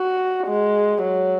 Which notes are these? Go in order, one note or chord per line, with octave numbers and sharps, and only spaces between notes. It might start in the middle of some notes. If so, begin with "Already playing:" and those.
Already playing: F#4
G#3
F#3